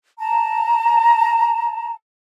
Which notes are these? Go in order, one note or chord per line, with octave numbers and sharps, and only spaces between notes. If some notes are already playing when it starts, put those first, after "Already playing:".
A5 A#5